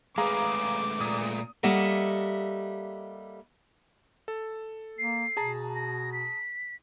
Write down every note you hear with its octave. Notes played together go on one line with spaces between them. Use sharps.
G#3 A3 G#4 B4 F5 A#5 D6
A#2 D#6
G3 A#3 A4 D#5 E5 F#5
A4
A#3 C7
B2 G#4 A5 A#5
A#6
B6